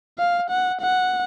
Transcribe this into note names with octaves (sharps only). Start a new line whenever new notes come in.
F5
F#5
F#5